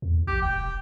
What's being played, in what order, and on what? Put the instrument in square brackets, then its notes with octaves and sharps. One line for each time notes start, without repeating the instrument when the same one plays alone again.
[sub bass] E2
[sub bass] A#1 [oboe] G4
[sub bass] E1 [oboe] G5